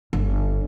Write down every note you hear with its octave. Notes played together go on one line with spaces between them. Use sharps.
G1